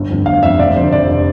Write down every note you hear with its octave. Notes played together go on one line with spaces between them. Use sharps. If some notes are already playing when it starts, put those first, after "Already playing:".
Already playing: G1
F2 D3
G1 F5
F2 D3 E5
F1 D5
F2 D3 C5
F1 D5
D3